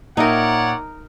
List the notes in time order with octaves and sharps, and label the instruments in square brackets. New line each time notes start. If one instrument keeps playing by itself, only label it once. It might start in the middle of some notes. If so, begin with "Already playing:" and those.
[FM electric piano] A#2 E5 G5 [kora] D#4 A#4 [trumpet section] C#5 D5 F#5